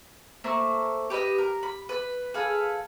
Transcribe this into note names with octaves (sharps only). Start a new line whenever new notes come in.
A3 A#3 C5
G4 B4 C5 D#5
A#4
B5
B4
G#4 A4 B4 F5